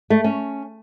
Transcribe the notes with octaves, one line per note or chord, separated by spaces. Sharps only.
A3
C#4